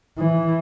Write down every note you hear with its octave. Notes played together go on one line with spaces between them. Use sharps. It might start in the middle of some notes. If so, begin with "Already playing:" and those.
E3